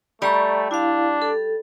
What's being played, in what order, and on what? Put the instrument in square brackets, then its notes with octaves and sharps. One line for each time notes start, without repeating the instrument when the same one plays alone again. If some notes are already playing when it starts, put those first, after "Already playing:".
[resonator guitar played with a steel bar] G3 [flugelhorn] A3 [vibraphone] D5 A#5 C#6
[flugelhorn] D4 [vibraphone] E4 F5
[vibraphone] A4